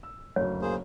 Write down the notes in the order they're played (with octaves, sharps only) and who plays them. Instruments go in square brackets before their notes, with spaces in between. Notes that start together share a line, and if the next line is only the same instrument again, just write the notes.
[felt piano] E6
[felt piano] F#1 D2 [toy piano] C#5
[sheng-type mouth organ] A#3 G#4 C5